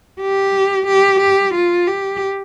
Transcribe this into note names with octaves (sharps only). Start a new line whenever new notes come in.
G4
G4
G4
F4
G4